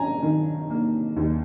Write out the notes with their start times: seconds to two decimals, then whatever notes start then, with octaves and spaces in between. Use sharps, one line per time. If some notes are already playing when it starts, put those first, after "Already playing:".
Already playing: C#4 G#5 A#5
0.23 D#3
0.70 A#3
1.17 D#2